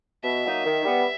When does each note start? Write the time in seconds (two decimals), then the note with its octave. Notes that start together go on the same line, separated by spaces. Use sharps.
0.24 B2 E5
0.45 F#3 A#3 D#4
0.65 D#3
0.85 G3 B3